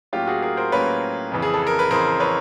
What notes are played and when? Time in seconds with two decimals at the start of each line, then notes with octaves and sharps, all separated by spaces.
0.13 A2 F#3 A#3 C#4 F4 G4
0.27 F#4 G#4
0.42 G#4 A#4
0.57 A#4 C5
0.72 A2 F#3 A#3 C#4 F4 B4 C#5
1.32 F2 C#3 E3
1.42 G#4
1.54 A4
1.67 A#4
1.79 B4
1.91 F2 C#3 E3 A#4 C5
2.20 B4 C#5